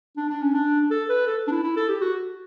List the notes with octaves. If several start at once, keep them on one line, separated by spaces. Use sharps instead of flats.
D4
D4
C#4
D4
A4
B4
A4
D4
E4
E4
A4
G4
F#4